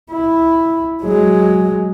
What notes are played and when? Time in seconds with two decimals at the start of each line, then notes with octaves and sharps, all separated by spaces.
0.12 E4
1.03 F#3 G#3